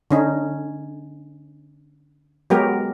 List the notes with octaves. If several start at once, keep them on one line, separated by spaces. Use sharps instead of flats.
D3 C#4 D#4
F#3 G#3 B3 G4 A#4